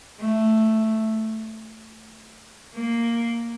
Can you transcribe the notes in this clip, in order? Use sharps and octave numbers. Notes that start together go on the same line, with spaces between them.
A3
A#3